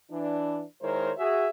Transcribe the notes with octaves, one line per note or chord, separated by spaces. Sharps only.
E3 D4
D#3 G#3 E4 A#4 C5 C#5
F#4 G#4 E5